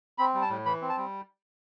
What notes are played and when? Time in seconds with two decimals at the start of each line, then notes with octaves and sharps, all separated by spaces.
0.18 C4 B5
0.34 G3
0.42 A5
0.50 A2
0.66 E3 B5
0.82 C4
0.89 A5
0.97 G3